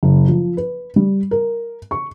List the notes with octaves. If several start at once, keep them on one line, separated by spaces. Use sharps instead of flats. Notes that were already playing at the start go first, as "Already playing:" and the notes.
F#1
F3
B4
G3
A#4
C#6